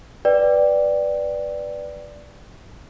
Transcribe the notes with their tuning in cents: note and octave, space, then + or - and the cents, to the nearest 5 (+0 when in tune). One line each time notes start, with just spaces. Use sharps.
B4 +0 D5 +0 G5 -5